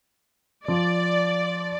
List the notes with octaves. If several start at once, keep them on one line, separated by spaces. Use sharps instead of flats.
F3 D5